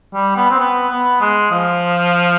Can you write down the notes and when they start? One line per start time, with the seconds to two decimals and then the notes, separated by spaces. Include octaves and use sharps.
0.14 G3
0.37 B3
0.50 C4
0.59 B3
0.90 B3
1.21 G#3
1.51 F3